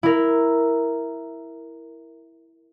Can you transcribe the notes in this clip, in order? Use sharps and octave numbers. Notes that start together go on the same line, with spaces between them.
E4 A#4